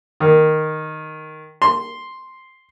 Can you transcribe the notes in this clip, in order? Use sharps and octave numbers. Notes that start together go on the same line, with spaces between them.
D#3
C6